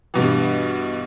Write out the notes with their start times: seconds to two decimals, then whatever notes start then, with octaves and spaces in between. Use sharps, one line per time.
0.14 G2 B2 E3